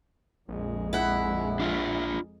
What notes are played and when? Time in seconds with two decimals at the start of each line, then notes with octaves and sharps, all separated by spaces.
0.49 A#1 F2 G#3
0.93 E4 F#5
1.60 D4 F4